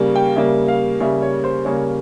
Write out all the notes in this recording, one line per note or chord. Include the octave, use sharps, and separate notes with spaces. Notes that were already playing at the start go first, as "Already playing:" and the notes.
Already playing: C#3 G3 A#3
G5
C#3 G3 A#3 E5
F5
C#3 G3 A#3 E5
C#5
C5
C#3 G3 A#3 C#5